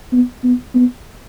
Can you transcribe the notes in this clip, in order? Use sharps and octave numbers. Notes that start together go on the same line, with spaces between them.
B3
B3
B3